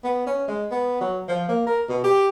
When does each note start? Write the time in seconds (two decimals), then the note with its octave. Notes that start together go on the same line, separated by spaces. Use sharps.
0.04 B3
0.27 C#4
0.48 G#3
0.71 B3
1.01 F#3
1.28 F3
1.48 A#3
1.66 A#4
1.89 B2
2.04 G4